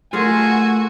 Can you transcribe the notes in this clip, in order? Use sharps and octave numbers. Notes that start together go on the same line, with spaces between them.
A3 F4 F#4 G#4 A#4 G#5